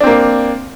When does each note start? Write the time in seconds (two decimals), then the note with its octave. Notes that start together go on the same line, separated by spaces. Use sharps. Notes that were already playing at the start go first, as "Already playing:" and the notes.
0.01 D4
0.04 C4
0.07 A#3